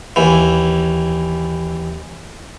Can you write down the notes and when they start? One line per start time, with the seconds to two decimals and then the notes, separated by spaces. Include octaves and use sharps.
0.16 D#2 E3